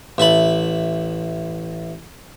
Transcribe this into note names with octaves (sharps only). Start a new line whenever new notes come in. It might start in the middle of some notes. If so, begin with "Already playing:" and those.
A1 E5 A5 B5